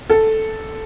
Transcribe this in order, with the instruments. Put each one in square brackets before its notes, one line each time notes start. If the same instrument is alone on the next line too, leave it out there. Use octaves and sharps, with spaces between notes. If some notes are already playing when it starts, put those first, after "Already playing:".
[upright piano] A4